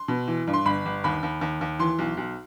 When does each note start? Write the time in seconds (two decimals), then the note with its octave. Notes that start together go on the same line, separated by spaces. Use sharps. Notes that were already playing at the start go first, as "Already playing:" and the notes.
Already playing: C6
0.08 B2
0.28 E3
0.47 G2
0.54 C6
0.65 G1 B5
0.85 G1
1.04 D#2 B5
1.23 D#2
1.41 D#2
1.61 D#2
1.79 E3 C6
1.99 B1
2.17 B1